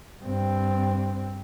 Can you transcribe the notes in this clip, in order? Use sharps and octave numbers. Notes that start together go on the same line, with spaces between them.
G2 C4